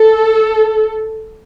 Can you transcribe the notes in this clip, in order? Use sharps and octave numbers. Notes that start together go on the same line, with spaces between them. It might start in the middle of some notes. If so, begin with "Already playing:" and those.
Already playing: A4